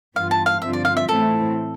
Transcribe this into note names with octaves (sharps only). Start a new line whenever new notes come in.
G2 E3 B3 F4 F5
A5
F5
G2 D3 F3 C4 F4 E5
D5
F5
E5
A2 E3 A3 C4 E4 A4